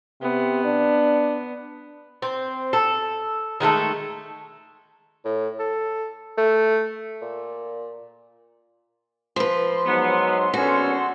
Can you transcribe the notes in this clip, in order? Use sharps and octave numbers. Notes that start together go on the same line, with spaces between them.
C3 B3
D4
C4
A4
D#3 G#3 A3 A4
A2
A4
A3
A#2
F3 B4 C6
G#2 F#3 B3
A#1 D3 B3 C#4 F#4 A4